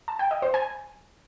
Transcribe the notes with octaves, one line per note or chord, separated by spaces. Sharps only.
A5
G5
D#5
C5
G#5